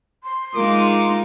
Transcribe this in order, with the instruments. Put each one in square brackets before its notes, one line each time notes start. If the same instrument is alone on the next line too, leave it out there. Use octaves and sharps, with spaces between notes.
[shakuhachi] C6
[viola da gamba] G#3 D#4 [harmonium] F4 A#4 [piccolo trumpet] D6